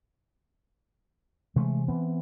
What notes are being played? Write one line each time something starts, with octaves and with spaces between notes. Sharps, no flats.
C3 E3 G#3 A3
E3 B3 C4